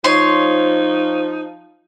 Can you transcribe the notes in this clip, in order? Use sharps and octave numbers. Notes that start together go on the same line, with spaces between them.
F3 D#4 C#5 C6